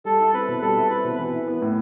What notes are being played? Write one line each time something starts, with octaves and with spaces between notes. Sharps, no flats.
G3 A4
E4
C4 B4
B2
G3 A4
E4
C4 B4
B2
E3
E4
B3
A2